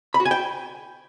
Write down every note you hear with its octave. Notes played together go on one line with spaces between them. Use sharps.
B5
F#4
G#5
G5